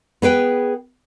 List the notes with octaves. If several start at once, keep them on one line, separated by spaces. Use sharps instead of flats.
B3 G#4 B4 G5